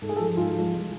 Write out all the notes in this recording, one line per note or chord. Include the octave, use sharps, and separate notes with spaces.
G#2 A4
G#4
F3 G#3 A4
G#2 F4
F3 G#3
C2